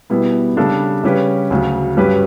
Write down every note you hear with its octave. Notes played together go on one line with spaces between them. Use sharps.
B2 G3 B3 E4
C#3 G3 D4 A4
C#3 G3 C#4 G4 B4
D2 C#3 F#3
G2 F#3 C#4 G4 B4